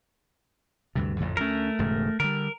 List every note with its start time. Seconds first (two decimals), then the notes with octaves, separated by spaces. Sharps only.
0.95 D2 G2 C3
1.18 A1 F2 D3
1.37 D2 F3 A3 C#4 A#4
1.79 E1 G#2 C#3
2.20 D3 G3 A#4